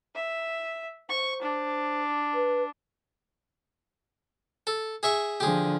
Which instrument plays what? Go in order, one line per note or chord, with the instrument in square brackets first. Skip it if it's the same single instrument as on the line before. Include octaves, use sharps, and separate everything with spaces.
[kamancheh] E5
[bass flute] C5 [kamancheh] C#6
[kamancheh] D4
[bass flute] B4
[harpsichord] A4
G#4 E5 C#6
[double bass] D3 F3 [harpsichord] G4 G#4